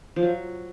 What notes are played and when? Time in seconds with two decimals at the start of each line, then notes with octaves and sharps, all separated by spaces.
0.16 F3
0.23 F#3